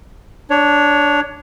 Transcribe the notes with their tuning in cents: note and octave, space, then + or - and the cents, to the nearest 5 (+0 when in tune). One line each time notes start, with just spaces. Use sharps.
D4 -5 C#5 +15